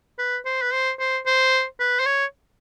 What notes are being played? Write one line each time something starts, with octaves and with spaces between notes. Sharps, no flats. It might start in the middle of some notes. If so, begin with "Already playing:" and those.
B4
C5
B4
C5
C5
C5
B4
C5
C#5